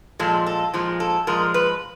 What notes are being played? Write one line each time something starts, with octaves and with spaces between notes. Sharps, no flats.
A#2 F3 G#3 A4
A4
A#2 F3 G#3
A4
A#2 F3 G#3 A#4
B4